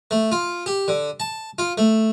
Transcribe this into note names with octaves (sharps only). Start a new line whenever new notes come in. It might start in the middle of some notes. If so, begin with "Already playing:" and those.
A3
F4
G4
D3
A5
F4
A3